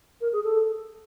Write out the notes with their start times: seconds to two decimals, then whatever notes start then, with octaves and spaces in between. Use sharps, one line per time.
0.21 A#4
0.33 G#4
0.44 A4